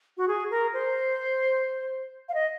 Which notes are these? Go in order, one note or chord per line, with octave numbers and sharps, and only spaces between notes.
F#4
G#4
A#4
C5
F5
D#5